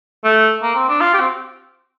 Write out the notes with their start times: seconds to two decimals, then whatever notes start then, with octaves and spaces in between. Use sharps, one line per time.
0.24 A3
0.62 A#3
0.75 C4
0.88 D4
1.01 F4
1.14 G4
1.20 C4